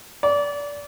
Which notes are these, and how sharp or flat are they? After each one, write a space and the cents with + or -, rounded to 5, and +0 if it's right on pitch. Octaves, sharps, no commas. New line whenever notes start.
D5 -25